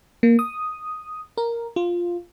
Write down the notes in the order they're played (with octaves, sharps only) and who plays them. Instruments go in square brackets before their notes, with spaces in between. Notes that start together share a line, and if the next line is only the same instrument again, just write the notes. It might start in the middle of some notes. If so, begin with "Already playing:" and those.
[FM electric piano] A#3
D#6
A#4
F4